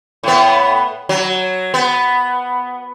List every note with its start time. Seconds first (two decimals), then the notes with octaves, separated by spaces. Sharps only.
0.23 A2 B3
1.09 F#3
1.74 B3